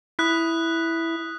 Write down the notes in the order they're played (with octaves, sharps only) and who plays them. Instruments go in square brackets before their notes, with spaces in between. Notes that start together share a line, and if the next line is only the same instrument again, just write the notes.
[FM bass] E4 [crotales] D#6 F#6 B6